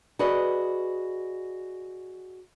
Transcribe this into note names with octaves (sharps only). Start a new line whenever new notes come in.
F#4 G#4 B4 D5 D#5